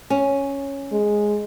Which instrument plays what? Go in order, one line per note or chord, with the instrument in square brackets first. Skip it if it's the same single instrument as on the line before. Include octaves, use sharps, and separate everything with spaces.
[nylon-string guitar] C#4
[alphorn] G#3